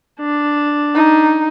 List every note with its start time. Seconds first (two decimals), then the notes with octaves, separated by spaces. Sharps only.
0.20 D4
0.95 D#4